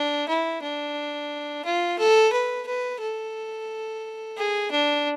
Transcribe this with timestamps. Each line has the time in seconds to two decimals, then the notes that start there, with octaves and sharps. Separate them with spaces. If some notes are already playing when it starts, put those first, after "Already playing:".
Already playing: D4
0.28 E4
0.62 D4
1.65 F4
1.99 A4
2.33 B4
2.67 B4
3.01 A4
4.37 G#4
4.72 D4